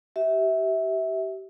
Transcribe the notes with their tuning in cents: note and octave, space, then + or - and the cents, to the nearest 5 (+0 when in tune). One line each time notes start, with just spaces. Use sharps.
G4 -30 E5 -20